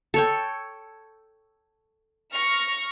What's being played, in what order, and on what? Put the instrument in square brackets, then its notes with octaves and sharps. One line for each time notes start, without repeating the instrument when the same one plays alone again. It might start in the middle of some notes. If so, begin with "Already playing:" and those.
[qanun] A4 C#5 G5
[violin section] C#6 F6 A#6